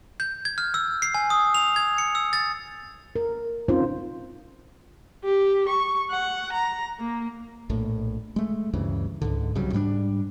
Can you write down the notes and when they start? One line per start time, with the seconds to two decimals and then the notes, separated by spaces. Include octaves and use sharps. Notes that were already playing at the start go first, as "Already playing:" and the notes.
0.20 G6
0.45 G#6
0.58 F6
0.74 E6
1.02 C7
1.14 G#5
1.30 D#6
1.55 F7
1.76 G#6
1.98 C#7
2.15 E6
2.33 A6
3.16 A#4
3.68 C4 C#4 D#4 F4 C5
5.24 G4
5.69 C#6
6.11 F#5
6.53 A#5
6.99 A#3
7.69 A#1 A2
8.36 G#3 A3
8.73 D2 G2 C#3 E3
9.22 C#2 G#2 D3
9.55 C2 C#3 F#3 G3
9.73 G#2 G3 B3 D4